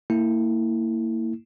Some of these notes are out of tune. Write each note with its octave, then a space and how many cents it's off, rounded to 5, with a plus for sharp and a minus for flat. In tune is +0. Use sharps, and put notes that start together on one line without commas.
A#3 -30 E4 -10